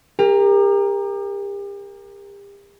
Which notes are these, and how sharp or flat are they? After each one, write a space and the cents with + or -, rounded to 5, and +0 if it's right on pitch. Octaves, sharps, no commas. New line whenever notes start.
G4 +40 A#4 +0